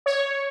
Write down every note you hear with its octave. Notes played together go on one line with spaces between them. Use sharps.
C#5